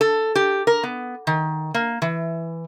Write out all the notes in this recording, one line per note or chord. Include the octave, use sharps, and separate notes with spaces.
A4
G4
A#4
B3
D#3
A#3
E3